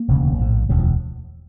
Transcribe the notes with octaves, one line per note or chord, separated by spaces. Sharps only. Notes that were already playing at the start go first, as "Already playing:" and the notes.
Already playing: A#3
E1 D2 C#3
A#1 A2
E1 D2 C#3
F3